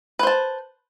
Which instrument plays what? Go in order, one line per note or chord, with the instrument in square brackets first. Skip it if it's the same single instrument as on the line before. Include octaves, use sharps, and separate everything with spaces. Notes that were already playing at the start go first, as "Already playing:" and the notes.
[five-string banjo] B4
C5
A5